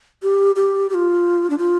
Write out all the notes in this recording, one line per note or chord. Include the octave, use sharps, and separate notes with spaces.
G4
G4
G4
F4
D4
F4